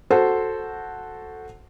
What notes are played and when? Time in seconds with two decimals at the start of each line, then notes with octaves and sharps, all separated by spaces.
0.10 F#4 A4 C5 F#5